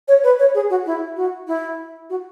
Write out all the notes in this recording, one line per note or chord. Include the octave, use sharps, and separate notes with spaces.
C#5
B4
C#5
G#4
F#4
E4
F#4
E4
F#4